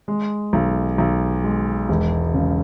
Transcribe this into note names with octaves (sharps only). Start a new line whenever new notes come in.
G#3
B1
B1
G#3
E1
C#3